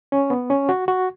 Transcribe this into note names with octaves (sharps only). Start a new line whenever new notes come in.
C#4
B3
C#4
F#4
F#4